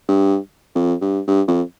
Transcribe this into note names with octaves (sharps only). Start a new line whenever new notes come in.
G2
F2
G2
G2
F2